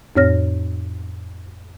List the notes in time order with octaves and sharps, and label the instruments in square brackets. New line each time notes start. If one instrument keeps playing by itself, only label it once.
[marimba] F2 A2 C4 C#5 F6 A#6